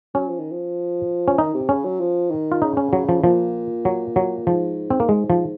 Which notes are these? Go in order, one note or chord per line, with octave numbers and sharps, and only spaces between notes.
F#3 C#4
F3
D#3
F3
C#4
D#3 D#4
C3
C#3 C#4
F#3
F3
D#3
F4
C#3 D#4
C#4
F#3
F3
A#2 F3
F#3
F#3
G#2 F3
C4
A#3
G#3
F3